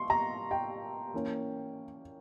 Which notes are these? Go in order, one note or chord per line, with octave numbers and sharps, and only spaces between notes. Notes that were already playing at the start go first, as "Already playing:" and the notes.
Already playing: C6 C#6
A#5
G5
E3 A#3 C#4